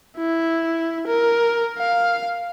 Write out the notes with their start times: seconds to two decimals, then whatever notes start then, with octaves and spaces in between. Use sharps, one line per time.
0.18 E4
1.07 A#4
1.78 F5